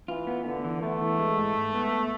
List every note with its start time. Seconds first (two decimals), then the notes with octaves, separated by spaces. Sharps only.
0.08 E3 F4
0.27 B3
0.46 D3 B3
0.64 E3
0.82 A3 B3
1.01 E3
1.19 G#3
1.38 G#2
1.55 G#2
1.74 B3